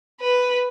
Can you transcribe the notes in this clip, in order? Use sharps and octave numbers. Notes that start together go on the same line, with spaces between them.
B4